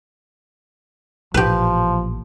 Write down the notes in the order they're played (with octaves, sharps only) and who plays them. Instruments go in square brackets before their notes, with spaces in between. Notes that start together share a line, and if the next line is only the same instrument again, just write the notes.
[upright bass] A1 A#2 [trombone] F3 [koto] G4 B4